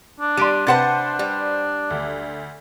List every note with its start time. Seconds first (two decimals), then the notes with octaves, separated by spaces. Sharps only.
0.20 D4
0.37 G3 C6 D7 D#7
0.67 C3 D4 B4 C5 F#5 A5 A6
1.19 G3
1.90 D2